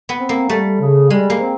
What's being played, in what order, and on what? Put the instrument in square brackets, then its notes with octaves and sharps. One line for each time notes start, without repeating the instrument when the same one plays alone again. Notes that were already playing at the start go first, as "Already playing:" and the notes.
[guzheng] B3
[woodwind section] C4
[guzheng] A#3
[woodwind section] G3 [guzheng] A3
[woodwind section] C#3
[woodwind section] G3 [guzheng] G#3
[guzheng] A#3
[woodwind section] C4